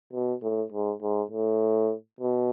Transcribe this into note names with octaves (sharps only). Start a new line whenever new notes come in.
B2
A2
G#2
G#2
A2
B2